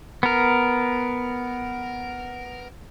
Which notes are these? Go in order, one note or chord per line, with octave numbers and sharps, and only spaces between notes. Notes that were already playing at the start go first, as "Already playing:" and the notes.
B3 A#4